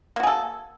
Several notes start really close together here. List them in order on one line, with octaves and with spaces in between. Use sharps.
A#3 F#4 G#4 A4